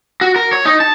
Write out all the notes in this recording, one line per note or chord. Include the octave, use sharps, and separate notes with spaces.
F#4
A#4
C#5
D#4
A5